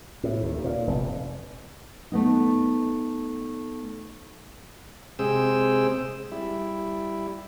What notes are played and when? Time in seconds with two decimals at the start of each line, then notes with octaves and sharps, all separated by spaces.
0.23 A2
0.43 D#2
0.64 A#2
0.87 F1
2.12 A3 B3 D#4
5.19 C3 G#3 C4 G#4 G5 E6
6.32 G3 E4